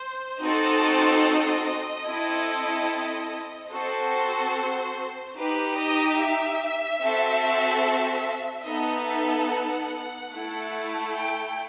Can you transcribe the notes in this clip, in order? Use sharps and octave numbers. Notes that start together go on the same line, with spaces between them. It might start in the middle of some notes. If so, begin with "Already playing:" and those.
Already playing: C5
C4 D#4 F#4 A4 D#5
C4 E4 A4
C4 F#4 A4 C5
D#4 G4 B4
D#5
E5
C4 F#4 A4
B3 D#4 A4 D#5
E5
F#5
A3 E4 A4
G5